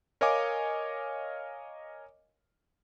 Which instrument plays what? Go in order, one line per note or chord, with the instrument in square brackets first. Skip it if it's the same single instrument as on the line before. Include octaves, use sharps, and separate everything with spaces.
[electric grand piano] A#4 C#5 D#5 F5 G#5 D6